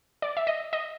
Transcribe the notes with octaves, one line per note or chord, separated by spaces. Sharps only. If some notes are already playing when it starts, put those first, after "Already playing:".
D5
E5
D#5
D#5